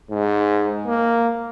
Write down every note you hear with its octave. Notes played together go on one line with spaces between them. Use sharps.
G#2
A#3